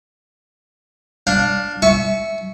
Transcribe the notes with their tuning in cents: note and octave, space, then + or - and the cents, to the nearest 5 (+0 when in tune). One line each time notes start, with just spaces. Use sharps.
D4 +0 F5 +20
E5 -5 A5 -45 C#6 +0